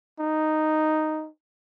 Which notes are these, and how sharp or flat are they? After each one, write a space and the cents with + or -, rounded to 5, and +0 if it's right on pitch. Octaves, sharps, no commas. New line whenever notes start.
D#4 -5